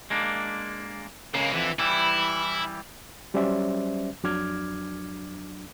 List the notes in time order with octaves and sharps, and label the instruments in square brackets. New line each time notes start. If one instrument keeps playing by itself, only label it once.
[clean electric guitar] G#3 A#3 D4
[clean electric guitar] C#3 [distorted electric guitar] G#3 A#3
[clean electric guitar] F2 D3 [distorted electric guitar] E3
[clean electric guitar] E3 G3 [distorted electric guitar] E4
[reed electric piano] F#3 G3 C#4 C5 D5 E5
F2 F#3 D4 D6 F6 G#6